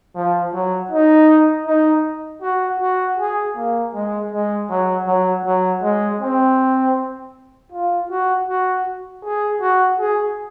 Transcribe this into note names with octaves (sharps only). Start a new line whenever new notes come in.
F3
F#3
D#4
D#4
F#4
F#4
G#4
A#3
G#3
G#3
F#3
F#3
F#3
G#3
C4
F4
F#4
F#4
G#4
F#4
G#4